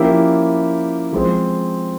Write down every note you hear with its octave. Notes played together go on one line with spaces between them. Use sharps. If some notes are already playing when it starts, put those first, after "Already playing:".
Already playing: F3 A#3 C#4 E4 G4
F3 G#3 C4